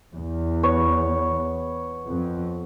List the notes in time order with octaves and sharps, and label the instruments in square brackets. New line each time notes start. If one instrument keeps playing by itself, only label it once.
[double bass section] E2
[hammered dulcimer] B3 C#5
[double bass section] F2